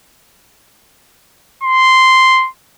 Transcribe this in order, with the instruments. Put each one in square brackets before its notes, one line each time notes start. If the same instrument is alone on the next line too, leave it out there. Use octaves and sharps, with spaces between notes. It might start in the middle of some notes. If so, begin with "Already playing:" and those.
[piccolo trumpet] C6